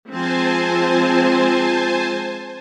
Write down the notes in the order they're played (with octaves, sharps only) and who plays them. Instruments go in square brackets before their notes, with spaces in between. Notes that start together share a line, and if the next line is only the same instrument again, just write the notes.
[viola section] F3 G#3 C4 [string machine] C5 G#5 A5